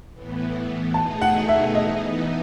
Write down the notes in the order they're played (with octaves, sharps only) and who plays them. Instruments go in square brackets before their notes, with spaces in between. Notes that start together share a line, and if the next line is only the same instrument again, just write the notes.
[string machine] A2 E3 B3
[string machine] B2 A3 D#4 G#4 [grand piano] A5
[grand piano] F#5
E5
[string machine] E3 B3 D#4 [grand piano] D#5